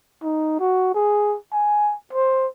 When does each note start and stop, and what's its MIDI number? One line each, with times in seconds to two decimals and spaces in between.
0.23 0.57 63
0.60 0.94 66
0.94 1.37 68
1.52 1.95 80
2.13 2.47 72